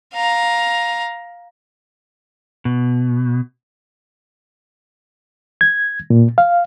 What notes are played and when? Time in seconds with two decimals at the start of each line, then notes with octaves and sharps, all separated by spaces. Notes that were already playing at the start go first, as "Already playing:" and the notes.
0.14 F5 A#5
2.65 B2
5.61 G#6
6.10 A#2
6.38 F5